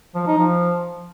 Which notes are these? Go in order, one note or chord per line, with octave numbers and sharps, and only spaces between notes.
F3
D#4
F3